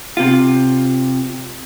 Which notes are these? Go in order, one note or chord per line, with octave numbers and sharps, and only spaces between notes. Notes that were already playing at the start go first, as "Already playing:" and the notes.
C3 F4